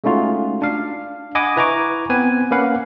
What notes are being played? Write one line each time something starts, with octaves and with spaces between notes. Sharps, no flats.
G#3 A3 C#4 D#4 F4 F#4
D4 F5
D#5 F#5 G#5 B5 D6 D#6
E4 B4 G#5 A#5 C#6 D6
B3 C4 B4 G#5
A#3 C#4 B4 F5 F#5